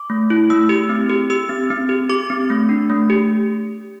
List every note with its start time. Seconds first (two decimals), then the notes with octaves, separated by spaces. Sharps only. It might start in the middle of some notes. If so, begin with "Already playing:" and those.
Already playing: D6
0.10 A3
0.30 E4
0.50 A3 E6
0.69 G4
0.89 C4
1.09 G4
1.30 G4 E6
1.49 C4
1.70 C4
1.89 G4
2.09 G4 D6
2.30 C4
2.50 A3
2.69 D4
2.90 A3
3.10 G4